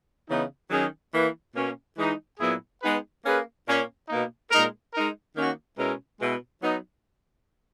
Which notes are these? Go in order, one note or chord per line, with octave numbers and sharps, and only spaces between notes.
C#3 E3 B3 D#4
D#3 F#3 C#4 G#4
E3 A#3 E4 B4
B2 A#3 C#4
E3 G#3 D#4
A#2 F#3 B3 E4 G#4
G#3 B3 D#4 G#4 B4
A#3 C#4 G#4 B4
A#2 A#3 C#4
B2 A#3 D#4
A#2 G#3 D#4 A#4
G#3 D#4 A#4
D#3 A#3 C#4 F#4
B2 G#3 C#4 E4 A#4
B2 G#3 B3 E4
F#3 B3 D#4